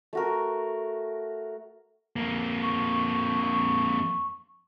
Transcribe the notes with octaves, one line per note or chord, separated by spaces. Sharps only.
A3 F#4 A#4
F2 A#3
C#6